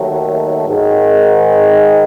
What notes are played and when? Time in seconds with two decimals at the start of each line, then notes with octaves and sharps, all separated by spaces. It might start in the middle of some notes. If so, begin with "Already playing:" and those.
Already playing: D#2 D#3 F#3 A3
0.68 G#2 D#3 G#3